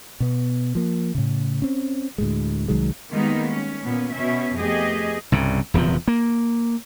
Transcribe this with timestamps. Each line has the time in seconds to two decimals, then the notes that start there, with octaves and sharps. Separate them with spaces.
0.20 B2 B3
0.75 F3 A#3
1.15 A2 C#3
1.62 C4 C#4
2.18 D2 A2 G#3
2.68 C2 D#3 F#3 G#3
3.10 D#3 G3 G#3 A#3 B3 D#4
3.50 C#4
3.84 A#2 B3 C#4
4.14 B2 C#4 E5
4.57 F2 A3 B3 G4 G#4 D#5
5.32 C2 G2 C#3
5.74 D#1 E2 C3 F3
6.08 A#3